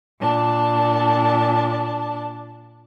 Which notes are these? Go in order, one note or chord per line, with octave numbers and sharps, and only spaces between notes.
A#2 D4 A5